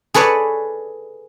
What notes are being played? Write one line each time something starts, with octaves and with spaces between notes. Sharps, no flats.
G#4 A4 B4 C#5 D5